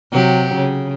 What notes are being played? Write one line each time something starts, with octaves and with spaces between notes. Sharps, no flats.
C3 F#3 G4
C#3